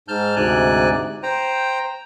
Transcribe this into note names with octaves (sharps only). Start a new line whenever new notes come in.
G#2 A5 F6 G6
D2 G#2 C3 D5 G#5 F#6
C5 G5 A#5